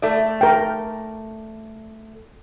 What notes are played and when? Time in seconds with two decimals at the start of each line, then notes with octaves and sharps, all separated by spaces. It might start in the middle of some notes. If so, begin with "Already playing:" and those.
0.02 A3 D5
0.41 A#4 G5